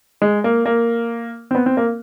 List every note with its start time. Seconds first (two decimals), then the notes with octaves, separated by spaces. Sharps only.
0.22 G#3
0.44 A#3
0.65 A#3
1.51 C4
1.55 B3
1.66 C4
1.77 A#3